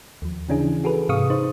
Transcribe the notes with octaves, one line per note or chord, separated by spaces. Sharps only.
D#2 F3
C#3 E3 C#4 D4 E4 G#4
F#4 G#4 A4 B4
G#2 C3 F5 C#6 D#6
D#4 C5